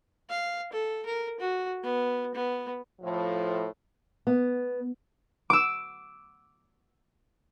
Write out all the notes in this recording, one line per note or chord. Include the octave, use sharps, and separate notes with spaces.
F5
A4
A#4
F#4
B3
B3
A2 F3
B3
D6 E6